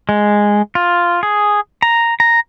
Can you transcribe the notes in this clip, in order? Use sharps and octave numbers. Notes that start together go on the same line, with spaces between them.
G#3
F4
G#4
A#5
A#5